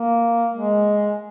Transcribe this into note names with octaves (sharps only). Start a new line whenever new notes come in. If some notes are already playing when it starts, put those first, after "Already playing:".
Already playing: A#3
G#3